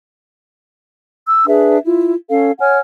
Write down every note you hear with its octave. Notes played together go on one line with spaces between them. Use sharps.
E6
D4 G#4 B4 E5
E4 F4
C#4 A4 F5
C#5 F#5 G#5 F6